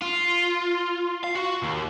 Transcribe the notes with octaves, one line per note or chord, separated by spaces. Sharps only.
F4
F5
F#4
D#2